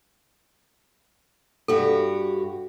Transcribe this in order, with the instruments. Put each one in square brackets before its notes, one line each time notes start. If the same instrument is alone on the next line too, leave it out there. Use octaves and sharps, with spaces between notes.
[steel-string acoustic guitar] G2 F#4 G4 [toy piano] A4